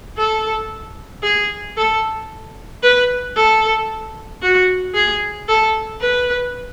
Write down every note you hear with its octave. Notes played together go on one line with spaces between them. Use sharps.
A4
G#4
A4
B4
A4
F#4
G#4
A4
B4